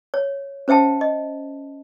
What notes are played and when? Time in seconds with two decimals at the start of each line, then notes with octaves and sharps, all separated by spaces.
0.14 C#5
0.68 C#4 C5 E5 G5 A5
1.01 D#5